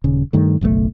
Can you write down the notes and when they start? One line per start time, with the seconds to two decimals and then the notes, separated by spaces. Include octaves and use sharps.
0.04 D#1 C#3
0.33 G2 D#3 A3
0.61 F#1 B1 B2 A3